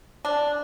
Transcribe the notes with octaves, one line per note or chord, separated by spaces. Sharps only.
D4